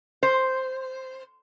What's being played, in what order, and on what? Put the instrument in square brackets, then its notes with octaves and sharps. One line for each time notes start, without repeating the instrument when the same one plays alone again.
[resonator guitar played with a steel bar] C5